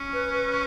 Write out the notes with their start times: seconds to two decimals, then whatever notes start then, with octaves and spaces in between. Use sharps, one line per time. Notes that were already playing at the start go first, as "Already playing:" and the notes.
Already playing: C#4
0.13 B4
0.34 B4